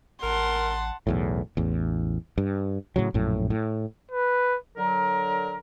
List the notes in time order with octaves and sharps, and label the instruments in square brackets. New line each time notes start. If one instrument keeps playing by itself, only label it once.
[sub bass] A1 [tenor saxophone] A#4 [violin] F#5 A5 [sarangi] C6
[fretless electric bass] B1 E2 A2
A1 E2
G2
A2 C#3 F#3
A#1 F#2 A2
A2
[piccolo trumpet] B4
[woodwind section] D3 F#3 A#4